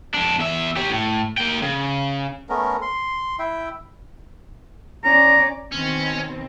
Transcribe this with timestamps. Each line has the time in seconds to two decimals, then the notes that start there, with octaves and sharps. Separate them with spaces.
0.14 F2 D4
0.39 E2 E5
0.77 G4 C#5
0.89 A2
1.38 A#3 G5
1.62 C#3
2.49 A3 B3 C#4 A#4
2.82 C6
3.39 E4 E5 G5
5.04 C#4 D5 A#5
5.72 B2 D#3 C4 C#4